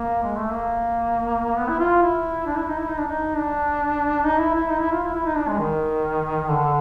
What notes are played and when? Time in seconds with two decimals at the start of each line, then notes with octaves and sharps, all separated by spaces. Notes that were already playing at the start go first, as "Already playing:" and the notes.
Already playing: A#3
0.23 G#3
0.37 A3
0.52 A#3
1.57 B3
1.69 E4
1.79 F4
2.02 E4
2.46 D4
2.58 E4
2.68 D#4
2.79 E4
2.89 D#4
2.98 D4
3.08 D#4
3.36 D4
4.25 D#4
4.40 E4
4.55 E4
4.70 D#4
4.81 E4
4.92 F4
5.03 E4
5.15 E4
5.26 D#4
5.36 D4
5.48 G#3
5.59 D#3
6.48 D3